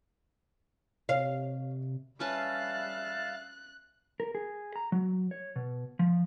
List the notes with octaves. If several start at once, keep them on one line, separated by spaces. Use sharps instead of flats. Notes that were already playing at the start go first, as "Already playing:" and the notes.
C3 C#5 F5
G3 C#4 B4 E5 F5 A5 F#6 A6
A#4
G#4
A#5
F#3
C#5
B2
F3